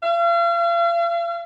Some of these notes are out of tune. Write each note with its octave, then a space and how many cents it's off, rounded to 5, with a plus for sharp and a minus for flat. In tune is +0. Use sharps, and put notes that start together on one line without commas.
F5 -40